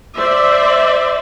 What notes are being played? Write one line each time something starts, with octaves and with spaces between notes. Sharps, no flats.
C5 D5 E5